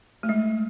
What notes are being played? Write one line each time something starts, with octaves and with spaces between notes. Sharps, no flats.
A3
G#3